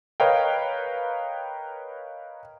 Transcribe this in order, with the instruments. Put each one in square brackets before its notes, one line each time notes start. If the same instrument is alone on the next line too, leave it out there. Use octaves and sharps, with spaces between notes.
[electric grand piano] A#4 B4 C#5 D#5 F5 G5